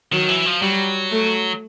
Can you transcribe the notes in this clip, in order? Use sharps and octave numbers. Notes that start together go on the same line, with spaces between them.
D#3 F#3
E3
F3
F#3 G3
A3